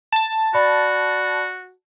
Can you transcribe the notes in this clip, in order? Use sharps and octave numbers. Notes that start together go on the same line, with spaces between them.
A5 A6
F#4 D5 B5